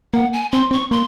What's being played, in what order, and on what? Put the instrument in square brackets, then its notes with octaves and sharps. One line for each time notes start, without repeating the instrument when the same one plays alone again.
[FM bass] A#3 [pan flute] F#5
[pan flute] G#5
[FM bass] C4 [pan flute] C6
[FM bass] C4 [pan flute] C#6
[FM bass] A#3 [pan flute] C6